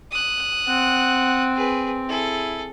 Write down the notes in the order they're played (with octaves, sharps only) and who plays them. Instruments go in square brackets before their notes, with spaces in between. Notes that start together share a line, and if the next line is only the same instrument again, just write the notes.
[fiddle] D#6 F#6
[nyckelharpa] C4 [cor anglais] F#5
[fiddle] G#4 B4
[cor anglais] E4 [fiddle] G#4 A4